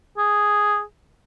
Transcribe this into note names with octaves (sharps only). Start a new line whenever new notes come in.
G#4